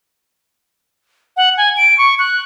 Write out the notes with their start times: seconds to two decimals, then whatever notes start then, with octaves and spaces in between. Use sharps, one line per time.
1.37 F#5
1.57 G#5
1.77 D7
1.98 C#6
2.19 F#6